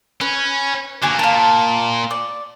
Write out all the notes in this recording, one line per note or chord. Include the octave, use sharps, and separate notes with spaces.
C#4 B4
D3 A#3 D4 F#4 G#5
A#2 F5 A5
D5